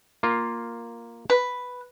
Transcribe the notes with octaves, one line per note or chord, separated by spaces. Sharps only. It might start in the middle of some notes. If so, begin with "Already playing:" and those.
A#3 F4
B4